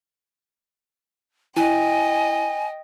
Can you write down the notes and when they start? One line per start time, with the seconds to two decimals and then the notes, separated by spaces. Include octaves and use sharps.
1.57 E4 D#5 G5 G#5